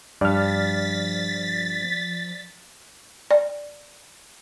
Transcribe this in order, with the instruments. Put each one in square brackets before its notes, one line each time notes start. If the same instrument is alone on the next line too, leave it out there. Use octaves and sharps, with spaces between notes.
[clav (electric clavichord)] G2 [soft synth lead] F3 [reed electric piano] D5 F6 [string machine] A6 B6
[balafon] D5